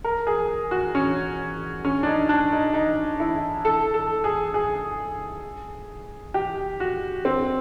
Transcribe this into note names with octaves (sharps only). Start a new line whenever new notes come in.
A#4
G#4
F#4
C#4
C#4
D4
D#4
D4
D#4
D#4
E4
A4
A4
G#4
G#4
G4
F#4
C4